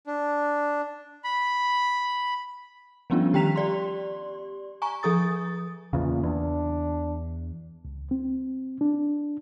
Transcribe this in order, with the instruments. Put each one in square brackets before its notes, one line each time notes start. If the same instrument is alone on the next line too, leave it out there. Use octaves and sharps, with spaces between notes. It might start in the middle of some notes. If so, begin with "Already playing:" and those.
[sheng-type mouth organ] D4
B5
[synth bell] F3 G3 B3 C#4 D4 F4
D#3 G4 G5 A#5 B6 F7
G4 D5 C6
G#5 A#5 C#6
F3 G#4 A4 D#6 A6
[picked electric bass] E2 C#3 [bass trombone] A#2
[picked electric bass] E2 [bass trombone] D4
[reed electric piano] C#2
C4
D4